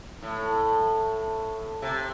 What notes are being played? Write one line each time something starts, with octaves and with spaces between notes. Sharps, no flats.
A2
C3